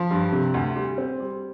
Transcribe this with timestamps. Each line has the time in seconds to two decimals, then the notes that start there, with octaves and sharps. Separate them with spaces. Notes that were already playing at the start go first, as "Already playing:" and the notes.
Already playing: F3
0.11 G2
0.32 C3
0.54 D2
0.76 G3
0.98 C4
1.20 G3